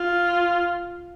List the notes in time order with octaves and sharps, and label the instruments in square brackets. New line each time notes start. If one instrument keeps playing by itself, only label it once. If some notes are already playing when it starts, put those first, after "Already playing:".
Already playing: [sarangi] F4